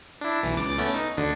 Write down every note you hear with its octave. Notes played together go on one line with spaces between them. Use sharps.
D4 E4
B1 E3
C#2 D6 A6
A3 B3 C#4
D#4
D2 D3 D4